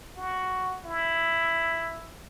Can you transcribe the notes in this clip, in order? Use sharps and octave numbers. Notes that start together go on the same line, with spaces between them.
F#4
E4